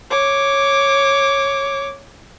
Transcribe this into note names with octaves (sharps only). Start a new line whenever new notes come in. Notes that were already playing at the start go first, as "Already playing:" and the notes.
C#5 D6